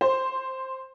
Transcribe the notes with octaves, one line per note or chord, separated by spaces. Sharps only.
C5